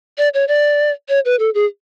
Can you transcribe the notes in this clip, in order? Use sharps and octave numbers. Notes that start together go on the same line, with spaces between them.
D5
C#5
D5
C#5
B4
A4
G#4